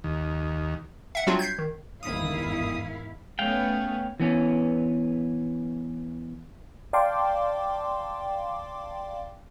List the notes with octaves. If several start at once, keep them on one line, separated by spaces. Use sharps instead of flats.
D#2
E5 F#5
F#3 G3 C4 D4 F4 F#4
G6 G#6 B6 C7
D#3
G1 E2 G#2 D#3 E4 F5 D#6
A3 B3 C#4 F5 G5
E3 B3 C#4
D5 F5 G5 A5 C6 D6